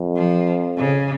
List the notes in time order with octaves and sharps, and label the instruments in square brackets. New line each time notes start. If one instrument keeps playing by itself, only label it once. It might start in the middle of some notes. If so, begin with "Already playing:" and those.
Already playing: [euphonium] F2
[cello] F3
C#3